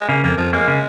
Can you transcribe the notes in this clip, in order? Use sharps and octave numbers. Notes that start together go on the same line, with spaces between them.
G#3
C#3 A#3
F2 A#3
F2 F3
G#3 A#3
C#3